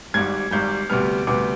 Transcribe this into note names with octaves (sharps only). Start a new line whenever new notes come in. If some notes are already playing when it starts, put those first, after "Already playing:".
G#1 G#2 G3 G#6
G#1 G#2 G3 G6
D2 C3 G3 B3 F6
D2 C3 G3 B3 D6